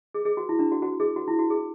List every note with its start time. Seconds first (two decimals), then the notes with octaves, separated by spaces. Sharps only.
0.14 G#4
0.25 G#4
0.37 F#4
0.49 E4
0.59 D4
0.72 F#4
0.82 F#4
1.00 G#4
1.16 F#4
1.28 E4
1.39 F#4
1.50 G#4